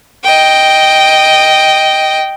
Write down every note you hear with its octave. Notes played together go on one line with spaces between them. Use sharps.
D#5 G5